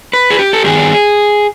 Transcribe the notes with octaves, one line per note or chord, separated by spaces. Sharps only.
B4
G#4
G4
A4
G2 D#3 G3 B3 G#4